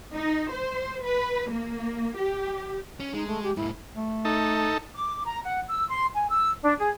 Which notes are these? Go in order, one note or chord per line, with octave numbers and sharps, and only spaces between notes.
D#4
C5
B4
A#3
G4
C#4
G#3 D#4
A3
G4
G#2 A#3 E4
A3
D#4 A4
D6
A#5
F#5
E6
C6
G#5
E6
D4
G#4